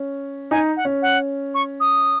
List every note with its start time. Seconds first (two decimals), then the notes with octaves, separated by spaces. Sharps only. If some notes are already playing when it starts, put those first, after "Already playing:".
Already playing: C#4
0.51 D#4 G#5
0.77 F#5
0.85 C#4
1.02 F#5
1.54 C#6
1.80 D#6